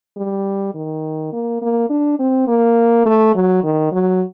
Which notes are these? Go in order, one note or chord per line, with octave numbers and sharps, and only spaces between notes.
G3
D#3
A#3
A#3
D4
C4
A#3
A3
F#3
D#3
F#3